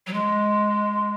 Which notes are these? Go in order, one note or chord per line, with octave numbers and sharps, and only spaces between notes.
F#3
G#3